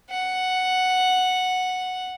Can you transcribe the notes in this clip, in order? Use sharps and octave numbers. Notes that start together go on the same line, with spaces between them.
F#5